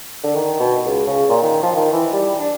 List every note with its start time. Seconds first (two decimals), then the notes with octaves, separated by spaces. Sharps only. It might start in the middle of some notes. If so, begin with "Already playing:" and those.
0.24 D3
0.36 D#3
0.60 B2
0.85 C#2
1.07 C#3
1.29 A#2
1.43 D#3
1.63 F3
1.77 D#3
1.92 E3
2.12 G3
2.39 D4